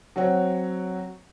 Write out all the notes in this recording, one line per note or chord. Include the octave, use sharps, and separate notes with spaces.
F#3 C4 C#5 F#5